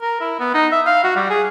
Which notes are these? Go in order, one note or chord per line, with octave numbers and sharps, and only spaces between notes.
A#4
E4
B3
D#4
E5
F5
F#4
G3
G#4